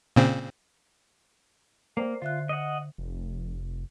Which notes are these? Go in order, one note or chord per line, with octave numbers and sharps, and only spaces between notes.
A#2 C#3 C4
A#3 C5 D5 G5
D3 F4 E5 F#6
D#5 F#5
F1